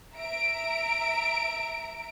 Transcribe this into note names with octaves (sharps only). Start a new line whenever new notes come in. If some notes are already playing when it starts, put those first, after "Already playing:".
E5 A#5 D7